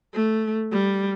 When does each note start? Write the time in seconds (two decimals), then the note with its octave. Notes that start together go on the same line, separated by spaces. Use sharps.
0.14 A3
0.72 G3